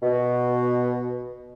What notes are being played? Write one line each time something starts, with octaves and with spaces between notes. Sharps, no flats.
B2